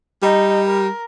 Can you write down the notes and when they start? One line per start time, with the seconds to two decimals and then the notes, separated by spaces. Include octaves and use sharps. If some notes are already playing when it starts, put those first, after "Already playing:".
0.22 G3 D#4
0.66 A#4